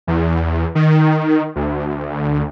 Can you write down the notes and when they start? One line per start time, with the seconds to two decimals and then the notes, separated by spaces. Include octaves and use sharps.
0.07 E2
0.75 D#3
1.56 D2